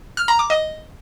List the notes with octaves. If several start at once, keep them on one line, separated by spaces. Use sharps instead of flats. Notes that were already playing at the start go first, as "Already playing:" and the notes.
F6
A#5
D6
D#5